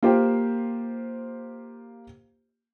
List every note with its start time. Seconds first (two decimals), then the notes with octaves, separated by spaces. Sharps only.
0.03 A#3 F4 G4 C5 G5